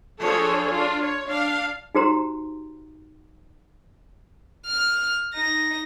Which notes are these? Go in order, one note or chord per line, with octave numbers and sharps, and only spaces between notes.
F3 D4 G#4 A4 C#5
D4 F4
C#5
D4 F5
D#4 F#4 G4 C5 A#5 C6
F6
D#4 A#6